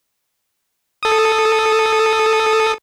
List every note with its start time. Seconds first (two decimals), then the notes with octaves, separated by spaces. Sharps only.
1.03 A4 D#6